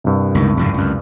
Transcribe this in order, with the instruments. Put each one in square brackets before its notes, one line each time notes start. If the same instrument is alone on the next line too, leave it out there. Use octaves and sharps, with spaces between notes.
[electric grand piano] C2 G2
[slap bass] C#2 D#3
F2 G#2 C#3
C#2 F#2